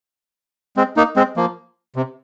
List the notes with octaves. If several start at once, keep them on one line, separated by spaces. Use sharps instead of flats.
G#3 C4
A#3 D#4
G#3 C4
F3 A#3
C3